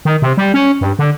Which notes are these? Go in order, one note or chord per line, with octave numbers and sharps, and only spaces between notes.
D#3
C3
G3
C#4
G2
D3